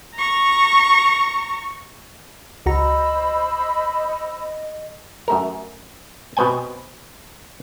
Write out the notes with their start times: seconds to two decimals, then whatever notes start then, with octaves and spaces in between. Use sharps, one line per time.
0.15 A#5 C#6
2.66 C#2 F#4 C5 D#5 A#5 B5 E6
5.28 F#2 A3 A#4
6.37 B2 B3 C4 G5 G#5